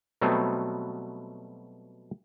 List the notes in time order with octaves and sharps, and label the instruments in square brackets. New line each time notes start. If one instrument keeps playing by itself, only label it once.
[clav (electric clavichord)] B2 F#3 G3 A3 B3 C4